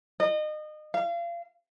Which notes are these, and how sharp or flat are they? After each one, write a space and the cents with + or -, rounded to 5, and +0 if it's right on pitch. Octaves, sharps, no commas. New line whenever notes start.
D#5 -30
F5 -30